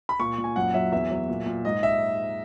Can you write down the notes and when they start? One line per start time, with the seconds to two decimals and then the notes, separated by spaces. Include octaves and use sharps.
0.09 B5
0.20 A#2 C#6
0.38 A#2
0.44 G#5
0.56 F#2 F#5
0.74 F#3 E5
0.92 E2 E5
1.10 F#3
1.29 A#2
1.46 A#2
1.65 G#2 D#5
1.83 E5